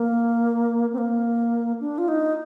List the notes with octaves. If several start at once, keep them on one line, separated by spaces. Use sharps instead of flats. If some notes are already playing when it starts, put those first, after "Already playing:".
Already playing: A#3
C4
A#3
D4
F4
D#4